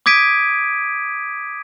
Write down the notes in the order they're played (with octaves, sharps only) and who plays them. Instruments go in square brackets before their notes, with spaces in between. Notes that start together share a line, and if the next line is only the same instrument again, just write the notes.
[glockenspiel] D6 D#6 G#6 B6 D7 D#7